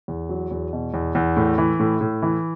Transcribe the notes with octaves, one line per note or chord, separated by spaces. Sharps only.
E2
F#3
E2
B2
E2
E2
A2
E3
A2
A2
E3